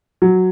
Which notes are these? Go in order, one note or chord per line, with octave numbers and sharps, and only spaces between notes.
F#3